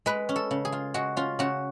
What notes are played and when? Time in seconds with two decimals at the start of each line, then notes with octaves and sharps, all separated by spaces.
0.06 G#3 B4
0.29 C#4
0.36 A4
0.51 C#3
0.65 G#4
0.72 F4
0.94 G#3 F#4
1.17 C#4 F4
1.39 C#3 F#4